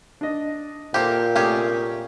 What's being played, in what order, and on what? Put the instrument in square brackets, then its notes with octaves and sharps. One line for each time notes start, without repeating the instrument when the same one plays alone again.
[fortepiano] D4 D#5
[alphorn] A#2 [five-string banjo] A#3 G4 [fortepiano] A4 C5
[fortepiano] C3 A3 A#4 [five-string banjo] C#4 G4 G#4